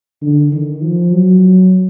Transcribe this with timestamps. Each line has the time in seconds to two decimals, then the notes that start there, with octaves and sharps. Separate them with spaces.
0.22 D3
0.52 D#3
0.81 F3
1.11 F#3